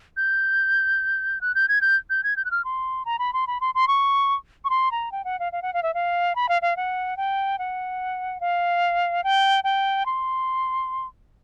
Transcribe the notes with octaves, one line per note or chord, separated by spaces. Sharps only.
G6
F#6
G6
G#6
G6
G6
G#6
G6
F#6
F6
C6
A#5
B5
C6
B5
C6
C6
C#6
C#6
C6
A#5
G5
F#5
F5
F5
F#5
F5
E5
F5
B5
F5
F5
F#5
G5
F#5
F5
G5
G5
C6